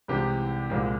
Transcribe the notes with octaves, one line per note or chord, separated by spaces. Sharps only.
C2 C3 E3 G#3 G4
C2 A#2 F3 G#3